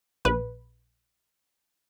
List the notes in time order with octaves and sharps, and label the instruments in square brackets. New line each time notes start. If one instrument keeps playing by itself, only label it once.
[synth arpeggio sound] A#1 B4